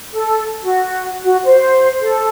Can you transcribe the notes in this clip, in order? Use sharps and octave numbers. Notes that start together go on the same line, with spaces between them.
A4
F#4
F#4
C5
A4